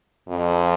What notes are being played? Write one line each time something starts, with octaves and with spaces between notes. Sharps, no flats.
F2